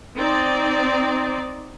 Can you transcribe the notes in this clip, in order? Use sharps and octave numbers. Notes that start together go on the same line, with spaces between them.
C4 D#4 D5